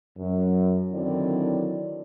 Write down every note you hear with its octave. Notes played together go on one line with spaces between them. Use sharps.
F#2
D3 D#3 F#3 C4 E4 D5